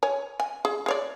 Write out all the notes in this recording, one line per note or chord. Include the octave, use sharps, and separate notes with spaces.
C#5 G#5
G#5
G#4
G#4 C#5 D5